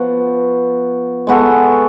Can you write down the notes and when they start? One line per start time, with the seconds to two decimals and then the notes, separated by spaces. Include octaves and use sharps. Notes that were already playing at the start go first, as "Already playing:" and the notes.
Already playing: F3 B3 F#4
1.27 G#3 B3 F#4 A4